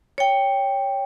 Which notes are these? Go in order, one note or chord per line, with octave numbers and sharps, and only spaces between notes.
C#5 G5